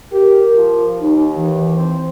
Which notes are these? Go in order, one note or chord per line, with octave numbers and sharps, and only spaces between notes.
G4 A#4
F3
D#2 D#4
E3
C4